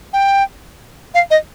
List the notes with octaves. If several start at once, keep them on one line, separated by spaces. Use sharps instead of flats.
G5
F5
D#5